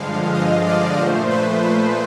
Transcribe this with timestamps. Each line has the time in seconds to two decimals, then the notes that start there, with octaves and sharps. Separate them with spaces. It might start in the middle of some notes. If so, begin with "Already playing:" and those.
Already playing: G2 D3 F3 G#3 F5
0.35 D#5
0.67 D5
0.98 A#2 F3 A3 C5
1.31 B4
1.62 B4